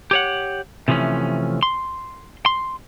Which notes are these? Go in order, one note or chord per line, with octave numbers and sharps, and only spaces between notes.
G4 C#5 F#5
C3 E3 F3 A3 C#4
C6
C6